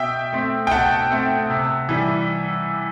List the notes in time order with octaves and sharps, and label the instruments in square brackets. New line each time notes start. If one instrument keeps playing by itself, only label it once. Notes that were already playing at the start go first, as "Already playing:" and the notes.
Already playing: [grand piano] B2 E5 G5
A3 C4
G5
B2 F#5 A5
A3 C4
C3
E3 G3